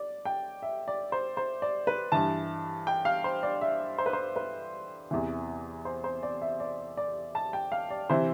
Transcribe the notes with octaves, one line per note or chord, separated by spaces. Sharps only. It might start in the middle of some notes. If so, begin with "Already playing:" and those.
Already playing: D5
G5
E5
D5
C5
C5
D5
B4
G2 E3 A5
G5
F5
C5
D5
E5
C5
B4
C5
B4
E2 C3 E3
C5
C5
D5
E5
D5
D5
A5
G5
F5
D5
C3 E3 C5